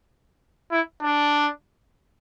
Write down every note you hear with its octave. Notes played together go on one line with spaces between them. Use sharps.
E4
D4